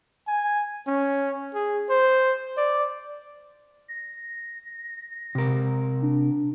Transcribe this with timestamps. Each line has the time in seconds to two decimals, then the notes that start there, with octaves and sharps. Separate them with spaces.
0.28 G#5
0.87 C#4
1.54 G#4
1.90 C5
2.57 D5
3.88 A#6
5.35 C3 A#4
6.02 D4